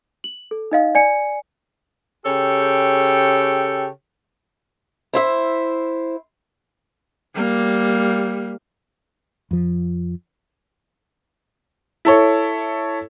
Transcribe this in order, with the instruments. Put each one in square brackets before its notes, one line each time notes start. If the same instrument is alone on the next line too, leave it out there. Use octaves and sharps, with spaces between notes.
[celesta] F#7
A4
D#4 D#5 F5
D5 G#5 C#7
[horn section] C#3 G4 A4 C#5 G5
[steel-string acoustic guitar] E4 C5 E5
[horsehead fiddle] G3 A#3
[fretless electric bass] F2 F3
[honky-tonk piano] E4 A4 C#5